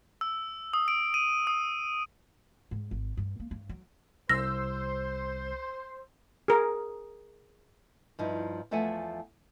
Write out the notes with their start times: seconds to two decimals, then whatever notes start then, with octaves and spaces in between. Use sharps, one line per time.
0.21 E6
0.73 D#6
0.88 D7
1.14 D#7
1.47 D#6
2.71 G#2
2.91 G#1
3.17 G2
3.40 A#3
3.51 G2
3.69 F#3
4.29 C2 C5 E6 A#6
6.48 G#4 A#4
8.19 G2 F3 D#4 E4
8.71 E2 F3 A3 E5 F#5 G#5